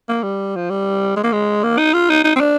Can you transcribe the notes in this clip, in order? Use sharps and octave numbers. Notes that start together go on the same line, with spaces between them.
A#3
G3
F3
G3
G#3
A#3
G#3
A#3
D#4
F4
D#4
D#4
C4
D4